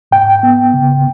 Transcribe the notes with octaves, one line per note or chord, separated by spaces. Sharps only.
G#2 G5
B3
C#3